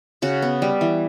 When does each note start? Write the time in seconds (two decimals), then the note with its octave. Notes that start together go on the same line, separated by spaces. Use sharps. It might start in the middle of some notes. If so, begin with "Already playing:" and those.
0.22 C#3 F#4
0.42 B3
0.62 G3
0.81 E3